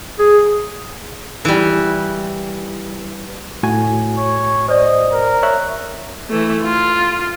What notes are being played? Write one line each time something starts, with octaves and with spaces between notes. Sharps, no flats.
G#4
E3 G3
A2 F#4 G#5
C#5
C5 D5 D#5
A#4
C#5 E5 F#6
E3 A3
F4